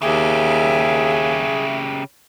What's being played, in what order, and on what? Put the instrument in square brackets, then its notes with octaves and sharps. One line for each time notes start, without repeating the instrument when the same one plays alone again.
[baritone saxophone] D#2 [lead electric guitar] C#3 G4 [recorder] G#4 [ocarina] E5